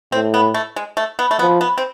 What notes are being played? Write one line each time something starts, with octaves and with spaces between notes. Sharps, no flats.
A2 C4
B3
A3
G#3
A3
B3
A3
F3 B3
B3
C4